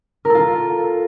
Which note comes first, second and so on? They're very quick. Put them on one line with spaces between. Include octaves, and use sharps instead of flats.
A#4 A4 F4